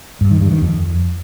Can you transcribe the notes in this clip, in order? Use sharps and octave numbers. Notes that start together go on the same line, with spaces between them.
G2
D#3
G2
D#3
F2